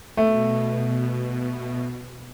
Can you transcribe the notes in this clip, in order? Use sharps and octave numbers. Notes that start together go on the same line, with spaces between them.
B2 A3